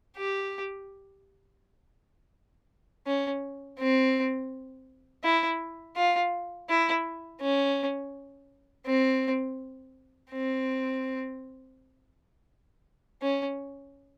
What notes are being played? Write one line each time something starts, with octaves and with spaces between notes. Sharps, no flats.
G4
C#4
C4
E4
F4
E4
C#4
C4
C4
C#4